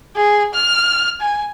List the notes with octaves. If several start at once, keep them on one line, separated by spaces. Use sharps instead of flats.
G#4
F6
G#5